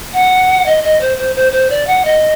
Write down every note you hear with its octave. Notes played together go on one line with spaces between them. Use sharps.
F#5
D#5
D#5
C5
C5
C5
C5
D5
F#5
D#5